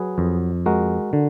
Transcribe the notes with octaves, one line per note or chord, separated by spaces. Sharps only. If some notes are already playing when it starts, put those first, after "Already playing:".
Already playing: F#3 G#4 B4
F2
G#3 F#4 A#4
D3